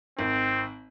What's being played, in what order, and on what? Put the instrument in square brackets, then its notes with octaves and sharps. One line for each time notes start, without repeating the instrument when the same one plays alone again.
[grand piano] G#1 [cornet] C4